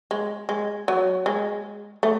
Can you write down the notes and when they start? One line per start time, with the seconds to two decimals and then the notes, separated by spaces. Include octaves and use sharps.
0.11 G#3
0.49 G#3
0.88 F#3
1.26 G#3
2.03 A3